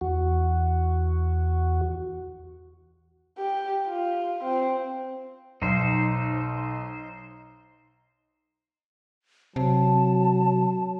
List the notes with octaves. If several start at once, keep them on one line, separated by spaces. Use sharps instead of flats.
E2 F#4
G4
F4
C4
B1 D#4 C5
C3 F#3 A5